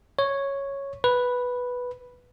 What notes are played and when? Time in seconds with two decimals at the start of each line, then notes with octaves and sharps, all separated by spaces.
0.19 C#5
1.04 B4